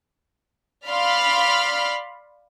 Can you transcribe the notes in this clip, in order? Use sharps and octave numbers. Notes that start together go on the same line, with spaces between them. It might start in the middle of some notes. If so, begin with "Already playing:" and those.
D5 F5 B5 C6 F6